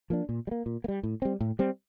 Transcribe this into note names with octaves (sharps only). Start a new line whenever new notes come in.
F3 A#3 D4
A#2
G3
A#3
A#2
A#3
G3
A2
G3 C4
A2
G3 C4